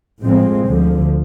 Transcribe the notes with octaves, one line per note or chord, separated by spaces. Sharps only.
A2 F3 G#3 C4
D2 D3 F3